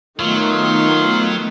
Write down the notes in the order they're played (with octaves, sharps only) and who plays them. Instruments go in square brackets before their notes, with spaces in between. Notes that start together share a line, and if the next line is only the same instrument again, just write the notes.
[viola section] D#3 [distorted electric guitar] F#3 [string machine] A3 B3 [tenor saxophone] F4